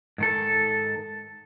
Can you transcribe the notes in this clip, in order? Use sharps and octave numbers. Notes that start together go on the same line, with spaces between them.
G#2 D#3 A4